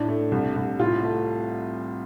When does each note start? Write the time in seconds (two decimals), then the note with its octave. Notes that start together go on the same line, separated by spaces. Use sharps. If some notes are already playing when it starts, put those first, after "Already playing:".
Already playing: A2 D4
0.08 A3
0.32 C2
0.56 C2
0.79 A2 F4
1.03 A3